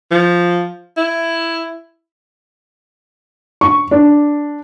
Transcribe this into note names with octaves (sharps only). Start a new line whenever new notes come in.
F3
E4
C#6
D4